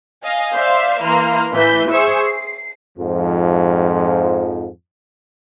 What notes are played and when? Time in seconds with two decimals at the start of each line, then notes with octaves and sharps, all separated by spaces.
0.23 D#5 F5 G#5
0.53 C5 D5 E5 F5 C6
1.03 E3 A#3 B4 C6 F6
1.53 A2 E3 B4 G6 B6
1.90 G#4 C5 E5 C#6 E6
2.25 C7
2.98 F2 G#2 F3